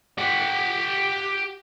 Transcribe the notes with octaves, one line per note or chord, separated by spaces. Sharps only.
G4 F#5